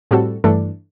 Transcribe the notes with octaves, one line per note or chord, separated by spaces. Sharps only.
A2 G3 C4 F#4 A4
G2 E3 A3 D4 A4